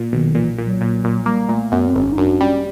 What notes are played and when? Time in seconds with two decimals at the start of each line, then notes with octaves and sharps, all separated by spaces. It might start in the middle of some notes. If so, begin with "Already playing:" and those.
Already playing: A#2
0.13 B1 D#3
0.35 A#2 E3
0.58 A#2
0.66 F#3
0.81 A#2
1.04 A#2
1.26 G3 A#3
1.49 A#2 A3
1.72 F#2 B3
1.87 C4
1.94 G#1
2.02 C#4
2.12 D#4
2.17 F#2 D4
2.41 G3 C#4